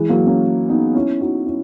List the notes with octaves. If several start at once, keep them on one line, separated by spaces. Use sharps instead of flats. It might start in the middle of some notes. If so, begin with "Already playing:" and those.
Already playing: E3 G#3
F#3 A#3
A#3 C#4
B3 D#4
C#4 E4
D#4 F#4
C#4 E4